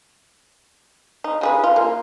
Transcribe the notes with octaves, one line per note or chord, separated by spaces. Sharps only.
D#4
C#3 G#4 B4
F4
A#3